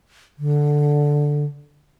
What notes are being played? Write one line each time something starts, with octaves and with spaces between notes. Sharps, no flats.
D3